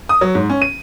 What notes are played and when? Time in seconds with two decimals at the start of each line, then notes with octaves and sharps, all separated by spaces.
0.09 D#6
0.21 F#3
0.35 G#2
0.49 C#4
0.62 D#7